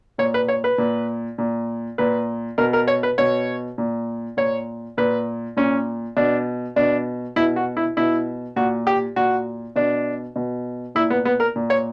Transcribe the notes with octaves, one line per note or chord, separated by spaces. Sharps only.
A#2 C#5
B4
C#5
B4
A#2
A#2
A#2 B4
B2 A#4
A#4
C#5
B4
B2 C#5
A#2
A#2 C#5
A#2 B4
A#2 C#4
B2 D4
B2 D4
B2 E4
F#4
E4
B2 E4
A#2 F#4
G4
A#2 F#4
B2 D4
B2
A#2 E4
B3
B3
A#4
A#2
C#5